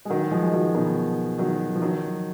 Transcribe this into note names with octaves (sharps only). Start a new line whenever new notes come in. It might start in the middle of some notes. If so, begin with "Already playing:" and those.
G#3
D#3 F#3
F3 G#3
G#3
D#3 F#3
B2 D#3
D#3 F#3
F3
D#3 F#3